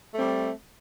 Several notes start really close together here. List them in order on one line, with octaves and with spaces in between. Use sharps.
A3 C4 G3